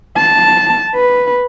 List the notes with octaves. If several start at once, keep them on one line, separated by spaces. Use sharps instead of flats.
A5
B4